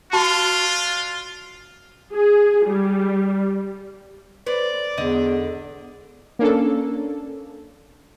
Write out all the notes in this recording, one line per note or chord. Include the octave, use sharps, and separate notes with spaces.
D4 F4 F#4 A5 C#6
G#4
G3
B4 C5 D5
E2 G#2 D3 D#5
A#3 C#4 D4 A4